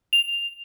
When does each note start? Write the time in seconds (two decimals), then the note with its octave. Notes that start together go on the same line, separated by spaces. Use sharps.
0.13 F7